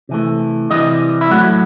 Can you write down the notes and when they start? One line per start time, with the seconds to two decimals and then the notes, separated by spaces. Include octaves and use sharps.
0.09 C3 E3 A3
0.70 C3 E3 G3 D#5
1.21 E4
1.31 A2 F#3 A3 F#4